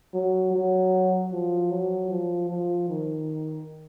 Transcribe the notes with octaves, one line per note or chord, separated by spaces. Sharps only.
F#3
F#3
F3
F#3
F3
F3
D#3